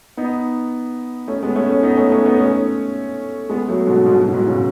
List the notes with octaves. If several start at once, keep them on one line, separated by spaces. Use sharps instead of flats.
B3 D#4
A3 C#4
G#3 B3
A3 C#4
A3 C#4
B3 D#4
A3 C#4
A3 C#4
B3 D#4
A3 C#4
G#3 B3
F#3 A3
G#2 B2
G#2 B2
G#2 B2
A2
G#2 B2
A2 C#3